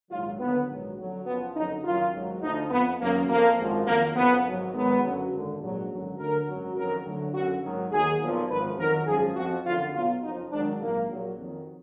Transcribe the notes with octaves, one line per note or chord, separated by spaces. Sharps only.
A#1 G#2 D#3 F#3 F4
D#2 D3 F#3 B3
A#1 G#2 D#3 F#3
F2 D3 F#3
F#1 F2 F3 B3
F#1 F2 D3 F#3 D#4
F#1 F#2 D#3 F#3 F4
G#1 G#2 F#3
D2 D3 F3 D#4
F2 F3 B3
F#1 F#2 D#3 A#3
F2 F3 A#3
G#1 F#2 F3
F2 D#3 F#3 A#3
F#1 F2 F3 B3
G#1 G#2 F#3
G#1 G#2 D#3 F#3 B3
F#1 F#2 D3 F#3
G#1 F#2 D3
A#1 G#2 F#3
G#1 F#2 D3 F#3
D2 D3 F#3 A#4
G#1 F#2 D#3 F#3
F#1 F2 D#3 F#3 A#4
D2 D3 F#3
F#1 F#2 D3 F#3 F#4
G#1 G#2 D#3 F#3
D#2 D#3 F#3 G#4
B1 A#2 F3
G#1 F#2 F3 B4
F2 D#3 F#3 A#4
G#1 F#2 F3 G#4
F2 F3 F#4
F#1 F#2 D3 F4
B1 B2 F#3 F4
F#1 F2 F3 D#4
G#1 G#2 D#3 F#3 D4
A#1 G#2 D#3 F#3 A#3
A#1 A#2 F#3
F2 D#3 F#3